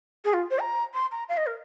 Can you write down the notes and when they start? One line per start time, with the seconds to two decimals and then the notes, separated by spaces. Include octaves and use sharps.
0.24 G#4
0.33 F4
0.50 C5
0.59 A#5
0.94 C6
1.12 A#5
1.29 F5
1.37 D#5
1.46 A#4